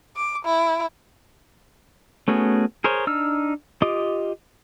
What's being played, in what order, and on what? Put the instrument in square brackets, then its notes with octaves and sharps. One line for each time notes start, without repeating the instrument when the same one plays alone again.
[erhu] D6
E4
[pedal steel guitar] A3 B3 C#4 F#4 G#4
G#4 A#4 C5 C#5
D4 D#4 E6 F6
F4 G4 D#5 D6 D#6